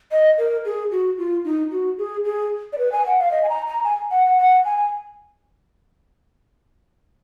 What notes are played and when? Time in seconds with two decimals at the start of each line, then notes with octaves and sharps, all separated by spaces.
0.12 D#5
0.38 A#4
0.65 G#4
0.91 F#4
1.18 F4
1.45 D#4
1.71 F#4
1.98 G#4
2.24 G#4
2.73 D5
2.78 B4
2.92 G#5
3.06 F#5
3.19 F5
3.32 D#5
3.43 G#5
3.49 A#5
3.67 A#5
3.84 G#5
4.11 F#5
4.25 F#5
4.38 F#5
4.65 G#5